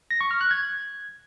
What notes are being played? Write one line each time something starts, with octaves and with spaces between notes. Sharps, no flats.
A#6
C#6
F6
F#6
G#6